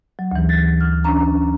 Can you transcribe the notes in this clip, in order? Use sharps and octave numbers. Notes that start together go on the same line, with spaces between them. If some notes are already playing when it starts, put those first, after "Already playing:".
F#3
D2 E3
A6
F6
C#4 D4 A#5